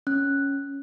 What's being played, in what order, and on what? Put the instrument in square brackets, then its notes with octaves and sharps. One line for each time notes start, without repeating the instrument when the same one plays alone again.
[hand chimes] C#4 F#6